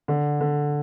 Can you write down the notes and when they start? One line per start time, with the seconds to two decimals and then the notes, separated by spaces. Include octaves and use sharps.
0.08 D3
0.41 D3